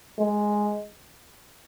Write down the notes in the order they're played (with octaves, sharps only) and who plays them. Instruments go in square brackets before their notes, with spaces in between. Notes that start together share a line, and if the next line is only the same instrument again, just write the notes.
[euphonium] G#3